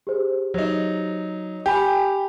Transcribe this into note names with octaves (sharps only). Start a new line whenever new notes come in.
G4 G#4 C5
F#3 D#4
G4 G5 G#5 B5